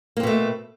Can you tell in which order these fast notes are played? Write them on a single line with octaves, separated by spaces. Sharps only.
A#3 C4 B2 A3